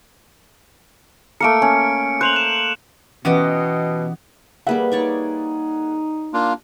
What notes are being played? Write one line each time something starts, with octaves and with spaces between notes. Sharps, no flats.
A3 A#3 A#4 C#7 D7
C#4
C5 F#6 F7 F#7
F#6 E7
B2 E3 B3 C#4 F#4 G4 B4 D#5
G3 A#3 G#4 B4 E5 F#5
D#4 C#5 D5 C#6
A#3 D4 F4